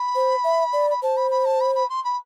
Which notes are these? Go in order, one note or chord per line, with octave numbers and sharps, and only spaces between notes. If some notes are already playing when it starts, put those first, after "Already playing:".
Already playing: B5
C5
E5
D5
B5
C5 A5
B5
B5
A5
B5
B5
C6
B5